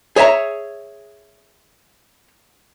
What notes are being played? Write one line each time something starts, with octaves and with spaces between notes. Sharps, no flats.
G#4 C#5 E5 G5 A#5